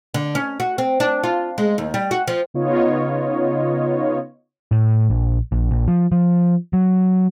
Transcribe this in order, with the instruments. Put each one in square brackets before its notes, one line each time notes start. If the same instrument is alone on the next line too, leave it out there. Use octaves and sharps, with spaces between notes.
[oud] D3
C#4
F#4
C4
D4
F4
G#3
D#2
G3
F#4
F3
[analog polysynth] C#3 B3 D#4 F4 C#5 D#5
[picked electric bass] A2
A#1
A#1
A#1
F3
F3
F#3